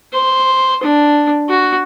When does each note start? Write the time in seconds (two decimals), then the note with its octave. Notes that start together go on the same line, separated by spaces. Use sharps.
0.13 C5
0.83 D4
1.49 F#4